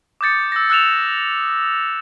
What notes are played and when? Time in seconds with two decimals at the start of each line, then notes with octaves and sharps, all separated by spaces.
0.21 D6 D#6 G6 A6 C#7
0.52 E6 A#6
0.70 E6 F#6 A6 E7 F7